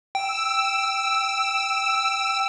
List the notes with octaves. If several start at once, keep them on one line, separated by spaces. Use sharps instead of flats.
G5 E6